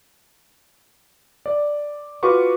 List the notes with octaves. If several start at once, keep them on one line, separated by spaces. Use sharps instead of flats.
D5
F4 F#4 B4 F#5 C#6 D6